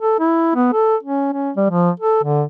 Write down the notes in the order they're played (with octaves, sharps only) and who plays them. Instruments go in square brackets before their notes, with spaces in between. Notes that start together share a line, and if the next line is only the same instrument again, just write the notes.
[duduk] A4
E4
B3
A4
C#4
C#4
G3
F3
A4
D3